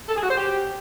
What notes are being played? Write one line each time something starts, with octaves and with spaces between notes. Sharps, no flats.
A4
G#4
F#4
C5
G4